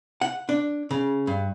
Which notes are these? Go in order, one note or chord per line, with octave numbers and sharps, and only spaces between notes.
F#5
D4
C#3
G2